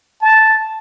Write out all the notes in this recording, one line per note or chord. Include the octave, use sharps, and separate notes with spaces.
A5